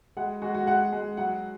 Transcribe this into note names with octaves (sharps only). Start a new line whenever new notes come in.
G#3 F#5
G#3 F#4
F#4
G#3 F#5
G#3
F#3 F#5